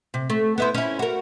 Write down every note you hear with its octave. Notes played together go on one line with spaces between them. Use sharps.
C3
A3
B3 E4 C5
C#4 E4
F#4 A#4